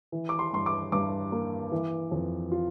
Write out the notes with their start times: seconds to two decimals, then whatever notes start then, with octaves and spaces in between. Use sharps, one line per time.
0.12 E3
0.29 D6
0.39 C6
0.53 G2 C6
0.66 D6
0.92 G2 D6
1.32 A#3
1.72 E3
2.11 F2
2.52 F4